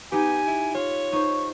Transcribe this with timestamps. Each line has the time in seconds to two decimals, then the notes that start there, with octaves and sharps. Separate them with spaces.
0.12 B3 D#4 G4 G#5
0.47 E4
0.75 F4 C#5
1.13 D#4 C5 C#6